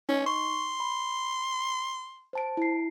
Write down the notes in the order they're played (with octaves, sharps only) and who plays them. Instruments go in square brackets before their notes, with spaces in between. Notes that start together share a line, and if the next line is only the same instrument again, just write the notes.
[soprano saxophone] C#4 [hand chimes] D#4
[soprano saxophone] C6 [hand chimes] C#6
[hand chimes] B5
C5 A5 D7
E4 C7